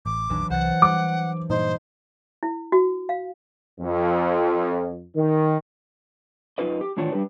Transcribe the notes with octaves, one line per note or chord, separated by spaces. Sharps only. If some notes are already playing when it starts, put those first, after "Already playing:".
A1 D6
A#1 E2 D#3 E3 F#3 D4
C2 C5 F#5 A6
G3 C6 D6
G2 A#2 D#4 C5
E4
F#4
F5
F2
D#3
F#2 G3 D#4 F4 B4 D#5
G4
A2 D#3 E3 D4 F4 C#5
G3 D4 G4 B4